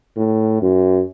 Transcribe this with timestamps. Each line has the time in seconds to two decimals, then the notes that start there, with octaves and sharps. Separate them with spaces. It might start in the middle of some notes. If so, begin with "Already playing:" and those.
0.17 A2
0.62 F#2